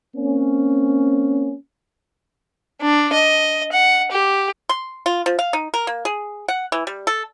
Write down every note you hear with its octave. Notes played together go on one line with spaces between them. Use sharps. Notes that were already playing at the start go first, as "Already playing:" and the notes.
A#3 C4 C#4
D4
D#5
F#5
G4
C6
F4
F3
F5
D#4
A#4
A#3
G#4
F#5
E3
G3
A4